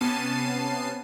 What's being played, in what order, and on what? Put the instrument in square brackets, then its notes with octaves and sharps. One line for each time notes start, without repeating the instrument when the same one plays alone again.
[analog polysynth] C3 B3 C#4 A5 C7 D#7